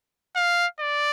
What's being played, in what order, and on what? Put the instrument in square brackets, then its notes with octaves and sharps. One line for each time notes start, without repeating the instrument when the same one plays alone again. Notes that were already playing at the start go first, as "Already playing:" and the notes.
[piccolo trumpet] F5
D5